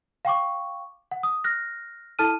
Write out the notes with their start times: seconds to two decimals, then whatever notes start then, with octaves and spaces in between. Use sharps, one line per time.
0.25 F5 G5 C#6 D6
1.11 F#5
1.23 D#6
1.44 F6 F#6 A#6
2.19 E4 A4 A5 F6 D#7